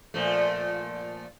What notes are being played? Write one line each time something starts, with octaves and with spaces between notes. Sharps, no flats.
A#2 F3 A3